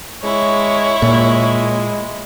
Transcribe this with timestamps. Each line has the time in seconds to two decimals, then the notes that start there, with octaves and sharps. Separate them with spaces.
0.23 G#3 E4 C#5
1.02 A#2 G#3